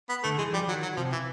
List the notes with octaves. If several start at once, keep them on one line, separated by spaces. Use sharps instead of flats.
B3
D3 A3
E3 G#3
F3 G3
D#3 F#3
F#3
C3 F3
E3